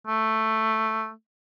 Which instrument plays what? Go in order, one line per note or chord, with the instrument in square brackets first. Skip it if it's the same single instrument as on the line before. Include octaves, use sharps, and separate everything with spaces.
[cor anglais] A3